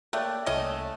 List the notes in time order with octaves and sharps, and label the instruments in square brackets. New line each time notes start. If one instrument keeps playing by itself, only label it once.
[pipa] A3 [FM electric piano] A#3 C#5 [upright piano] D5 G5 F#6
[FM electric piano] C2 E4 D#6 [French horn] A3 [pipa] C#4 D#5